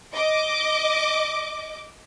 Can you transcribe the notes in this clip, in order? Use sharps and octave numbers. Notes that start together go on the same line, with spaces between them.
D#5 D6